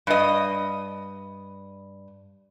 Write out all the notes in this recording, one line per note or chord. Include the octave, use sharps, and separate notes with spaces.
G2 D#5